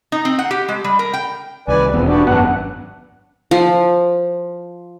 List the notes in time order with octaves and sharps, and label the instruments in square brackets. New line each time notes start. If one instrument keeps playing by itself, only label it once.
[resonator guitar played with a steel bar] D#4
C4
F#5
G4
G#3
G3
A#4
G5
[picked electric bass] C2 D#3 [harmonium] B4 D5 G#5
[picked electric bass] E1 E2 [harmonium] A#2 C4 [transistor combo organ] B3
[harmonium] B3 F#4 G4 [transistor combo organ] D4
[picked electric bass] G#1 F#2 [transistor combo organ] B3 F#5 [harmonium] D4
[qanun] F3